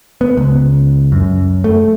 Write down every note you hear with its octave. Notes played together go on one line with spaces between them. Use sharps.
B3
C#2
F#2
A3